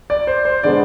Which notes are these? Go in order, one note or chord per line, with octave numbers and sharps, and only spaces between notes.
D5
C5
C5
D3 G#3 B3 D5